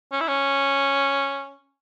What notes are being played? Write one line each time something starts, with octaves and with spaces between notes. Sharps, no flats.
C#4
E4
C#4